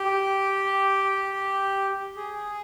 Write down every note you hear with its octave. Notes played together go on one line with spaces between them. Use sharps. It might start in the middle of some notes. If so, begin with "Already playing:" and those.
Already playing: G4
G#4